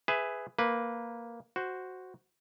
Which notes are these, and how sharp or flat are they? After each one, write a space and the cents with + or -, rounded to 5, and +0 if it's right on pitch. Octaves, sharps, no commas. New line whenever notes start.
G#4 +0 B4 +15 E5 +0
A#3 +0 B4 -5
F#4 +0 C5 +0